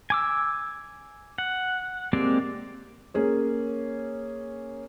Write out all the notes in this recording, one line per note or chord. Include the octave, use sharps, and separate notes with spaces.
G#5 D6 E6
F#5
G#3 A#3 C4 G4 D5
A#3 C#4 G#4 C#5